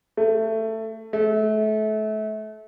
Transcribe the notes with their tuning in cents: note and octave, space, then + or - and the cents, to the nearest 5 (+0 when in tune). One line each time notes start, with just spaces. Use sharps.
A3 +15
A3 -30